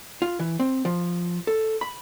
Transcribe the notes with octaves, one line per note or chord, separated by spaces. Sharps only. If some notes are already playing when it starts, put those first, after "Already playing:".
F4
E3
C4
F3
A4
B5